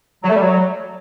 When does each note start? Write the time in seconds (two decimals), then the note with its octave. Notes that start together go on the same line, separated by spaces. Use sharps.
0.24 F#3
0.29 A3
0.35 G3
0.41 F#3